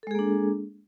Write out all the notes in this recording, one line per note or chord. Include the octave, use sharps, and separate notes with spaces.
G#3 A#3 D4 G#4 A4